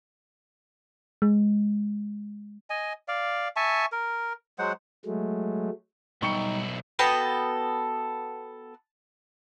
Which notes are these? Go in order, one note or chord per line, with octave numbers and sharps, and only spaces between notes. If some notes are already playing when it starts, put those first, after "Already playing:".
G#3
D#5 G#5
D5 F5
E5 G#5 A5 C#6
A#4
F#3 G#3 C5 F#5
F#3 G#3 A3
B1 B2 G3 D#4 E4 G5 C#6 C#7
B3 F#4 A4 G5